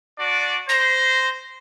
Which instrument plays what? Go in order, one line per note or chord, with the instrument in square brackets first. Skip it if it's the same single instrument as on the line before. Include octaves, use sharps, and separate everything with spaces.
[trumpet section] D4 F#4 D5
[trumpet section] C5 [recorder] A#6